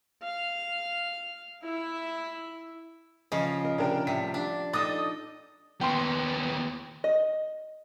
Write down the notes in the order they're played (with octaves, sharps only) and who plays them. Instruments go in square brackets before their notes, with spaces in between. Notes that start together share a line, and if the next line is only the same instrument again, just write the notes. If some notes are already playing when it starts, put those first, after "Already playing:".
[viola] F5
E4 E5
[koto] C#3 F3 [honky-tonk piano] D#5
[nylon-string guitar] A#4
[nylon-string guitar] C3 [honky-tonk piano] D4 A#4 G5
[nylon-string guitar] A2 G3 [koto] C3 [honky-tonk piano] B6
[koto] D4 [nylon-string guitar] F4
[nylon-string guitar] D4 D#4 A4 [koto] D#5 G5 [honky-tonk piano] D6 D#6 A6
[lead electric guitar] D#2 B3 [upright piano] G5 C6
[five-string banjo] D#5